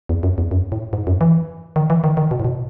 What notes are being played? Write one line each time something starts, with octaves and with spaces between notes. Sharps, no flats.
E2
F#2
E2
F#2
A2
G#2
F#2
E3
D#3
E3
D#3
D#3
B2
A2
B2